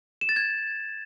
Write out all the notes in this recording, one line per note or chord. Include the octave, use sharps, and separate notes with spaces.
E7
A6
G#6